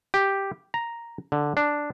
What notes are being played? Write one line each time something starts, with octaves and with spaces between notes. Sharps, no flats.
G4
A#5
D3
D4